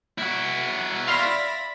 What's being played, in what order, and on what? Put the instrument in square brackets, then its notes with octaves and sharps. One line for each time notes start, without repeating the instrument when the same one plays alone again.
[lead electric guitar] E4 F#4 [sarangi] F#5
[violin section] D5 E5 A#6 [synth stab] F5 C6 F6 [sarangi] B5